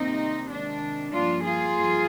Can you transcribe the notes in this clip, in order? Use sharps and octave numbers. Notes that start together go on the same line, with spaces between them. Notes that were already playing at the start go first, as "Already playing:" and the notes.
Already playing: C3 D#3 G3 A#3 C4 D#4
C3 D#3 G#3 D4
G2 F3 A#3 D4 F4
F4 G#4
G2 F3 A#3